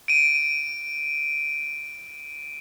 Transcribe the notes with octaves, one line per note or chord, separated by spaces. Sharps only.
D7 D#7